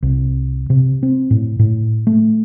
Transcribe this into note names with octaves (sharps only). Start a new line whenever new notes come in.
C2
C3
C4
A2
A2
A3